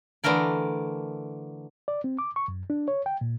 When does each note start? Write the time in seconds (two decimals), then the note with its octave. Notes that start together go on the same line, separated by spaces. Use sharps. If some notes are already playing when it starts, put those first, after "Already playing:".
0.24 D3 E3 A3 A#4 D5
1.88 D5
2.04 C4
2.19 D6
2.36 C#6
2.48 F#2
2.70 D4
2.88 C#5
3.06 G5
3.21 A#2